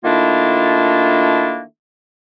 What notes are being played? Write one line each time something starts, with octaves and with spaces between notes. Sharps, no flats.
D#3 A3 A#3 D4 E4 F4